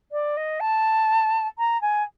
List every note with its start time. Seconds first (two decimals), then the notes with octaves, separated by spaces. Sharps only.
0.12 D5
0.37 D#5
0.60 A5
1.58 A#5
1.81 G#5